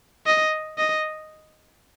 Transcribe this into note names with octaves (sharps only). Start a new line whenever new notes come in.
D#5
D#5